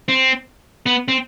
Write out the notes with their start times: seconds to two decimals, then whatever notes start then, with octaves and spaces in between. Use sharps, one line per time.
0.08 C4
0.86 B3
1.08 C4